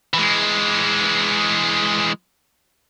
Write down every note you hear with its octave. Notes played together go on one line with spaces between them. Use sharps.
E3 G#3